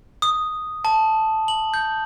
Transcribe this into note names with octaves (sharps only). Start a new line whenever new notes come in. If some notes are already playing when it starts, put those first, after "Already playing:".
D#6
A5
F#7
G6